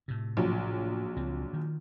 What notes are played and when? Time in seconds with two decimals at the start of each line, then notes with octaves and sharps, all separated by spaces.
0.08 A2 C3
0.37 A#1 F#3
1.16 C#2 C4
1.53 D#3